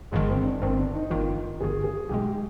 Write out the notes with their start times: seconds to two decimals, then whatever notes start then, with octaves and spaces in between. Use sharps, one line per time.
0.12 G1 G2 D#3 G#3
0.29 C4
0.45 D4
0.62 G1 G2 D#3 C4
0.78 D4
0.95 D#4
1.10 G1 G2 D#3 F4
1.60 G1 G2 D#3 G#4
1.84 G#4
2.09 B1 B2 G#3 G4
2.26 G4